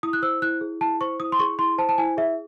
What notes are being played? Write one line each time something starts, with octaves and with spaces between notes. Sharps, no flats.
E4 D#6
F#6
C5 E6
E4 F#6
G#4
E4 A5
C5 C#6
E4 D#6
C6
G#4 C#6
E4 C6
C5 A5
A5
E4 G#5
G#4 E5